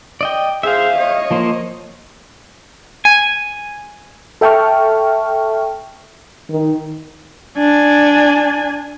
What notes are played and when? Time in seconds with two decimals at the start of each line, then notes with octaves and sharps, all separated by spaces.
0.21 D5 D#5 G5
0.63 G#4 C5 E5 F5
0.96 C#5 D#5
1.31 F3 A#3 C5
3.05 G#5
4.41 A4 E5 G5 A5 C#6 F6
6.51 D#3
7.57 D4 G#5